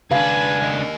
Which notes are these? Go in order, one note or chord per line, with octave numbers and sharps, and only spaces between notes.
C#2 D4 B4 F5 G#5
A#3 D#5